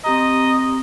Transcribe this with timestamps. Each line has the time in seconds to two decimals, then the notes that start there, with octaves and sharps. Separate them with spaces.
0.04 C4 G4 D#5 A#5